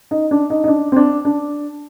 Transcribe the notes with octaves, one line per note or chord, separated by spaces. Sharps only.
D#4
D4
D#4
D#4
D4
C4
D4
D4